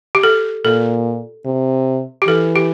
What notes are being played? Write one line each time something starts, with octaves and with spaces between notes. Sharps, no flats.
G4
A4
A#2 A4
C3
G4
E3 A4
G4